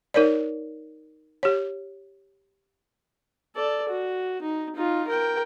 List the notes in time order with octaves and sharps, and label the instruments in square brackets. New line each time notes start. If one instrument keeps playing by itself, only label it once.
[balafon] D#4 A#4 C#5 D5
G4 C#5
[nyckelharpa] A4 D5
F#4
D#4
D#4 F4
A#4 G5